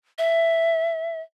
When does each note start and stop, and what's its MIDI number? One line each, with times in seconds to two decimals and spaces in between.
0.18 1.21 76